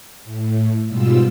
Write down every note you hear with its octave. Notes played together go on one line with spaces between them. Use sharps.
A2
G#2 B2 G3 F4 E6